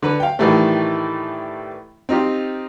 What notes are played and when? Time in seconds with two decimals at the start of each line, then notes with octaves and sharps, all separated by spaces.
0.02 D3 B4
0.20 F5 G5
0.39 A2 D#3 E3 G3 A3
2.09 C4 D#4 F4 G4